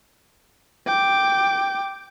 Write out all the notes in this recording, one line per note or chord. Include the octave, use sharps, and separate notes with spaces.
G5 D6